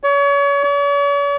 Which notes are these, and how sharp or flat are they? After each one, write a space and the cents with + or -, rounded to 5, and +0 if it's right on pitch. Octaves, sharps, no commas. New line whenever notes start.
C#5 +35
C#5 +45